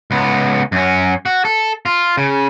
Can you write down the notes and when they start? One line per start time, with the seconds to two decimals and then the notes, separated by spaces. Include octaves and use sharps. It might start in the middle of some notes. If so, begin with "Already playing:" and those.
0.11 C#2 B3
0.72 F#2 C#4
1.26 F#4
1.45 A4
1.86 F4
2.17 C#3